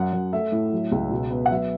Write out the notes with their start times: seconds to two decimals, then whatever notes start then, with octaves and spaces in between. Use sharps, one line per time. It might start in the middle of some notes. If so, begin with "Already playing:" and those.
Already playing: F#2 F#5
0.13 F#2
0.33 A3 E5
0.52 A2
0.73 F#3
0.92 C#2
1.11 B2
1.31 B3
1.46 F#5
1.51 F#3 E5